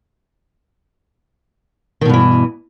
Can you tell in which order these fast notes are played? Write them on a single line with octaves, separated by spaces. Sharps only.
D#3 B2 G2 E3